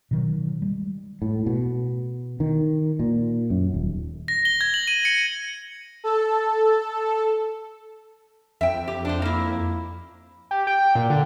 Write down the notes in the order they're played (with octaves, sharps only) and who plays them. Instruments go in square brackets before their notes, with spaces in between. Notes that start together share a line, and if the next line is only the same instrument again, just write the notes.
[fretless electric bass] B2 D#3 F#3
G3 G#3
A2
B2
D#3
A#2
F#2
D#1
[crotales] A#6
G7
G#6
F#7
D#7
C#7
[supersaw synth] A4
[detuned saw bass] F2 [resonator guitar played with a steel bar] E5 G5
[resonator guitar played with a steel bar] G4
D4 C5
A#3 E4
[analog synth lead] G4
G5
G5
A#2
D3